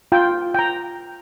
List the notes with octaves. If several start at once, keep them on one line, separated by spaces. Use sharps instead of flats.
F4 G5
G5 A#5